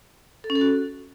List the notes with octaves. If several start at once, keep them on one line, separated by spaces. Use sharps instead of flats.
A4
C#4
A4
F#4